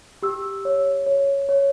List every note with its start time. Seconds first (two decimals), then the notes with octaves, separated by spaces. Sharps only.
0.23 G4 E6
0.65 C#5
1.06 C#5
1.49 C#5